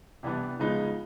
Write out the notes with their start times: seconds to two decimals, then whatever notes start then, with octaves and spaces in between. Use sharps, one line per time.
0.23 C3 E3 G3 B3 D4
0.59 C#3 F3 G#3 B3 D#4